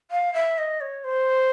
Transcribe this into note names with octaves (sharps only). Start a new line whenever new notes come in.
F5
E5
D#5
C#5
C5